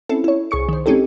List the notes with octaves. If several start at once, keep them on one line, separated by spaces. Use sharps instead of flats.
C4 C#4 E4 A4
E4 C#5
C2 G#4 C#6 C#7
D#3 C5
G#3 C4 C#4 D#4 G4 A4